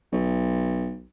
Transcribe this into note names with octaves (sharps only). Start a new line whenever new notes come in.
B1